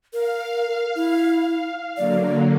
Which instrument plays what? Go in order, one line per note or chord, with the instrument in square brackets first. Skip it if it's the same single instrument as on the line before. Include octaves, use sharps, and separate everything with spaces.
[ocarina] A#4 [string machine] F5
[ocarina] E4
[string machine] D3 F#3 A#3 [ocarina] D5